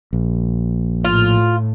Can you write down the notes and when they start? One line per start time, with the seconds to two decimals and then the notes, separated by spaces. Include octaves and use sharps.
0.13 A#1
1.04 A2 F4